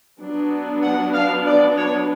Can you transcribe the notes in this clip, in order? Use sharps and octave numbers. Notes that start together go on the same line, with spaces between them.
F#3 B3 D4
F#5
F5
D5
C#5